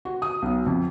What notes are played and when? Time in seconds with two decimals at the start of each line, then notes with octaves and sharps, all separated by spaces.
0.05 F#4
0.22 D#6
0.42 B1
0.66 F2